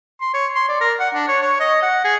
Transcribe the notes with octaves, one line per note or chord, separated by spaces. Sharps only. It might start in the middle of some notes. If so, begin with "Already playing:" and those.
C6
C#5
C6
D5
A#4
F#5
D4
C#5
C#5
D#5
F#5
G#4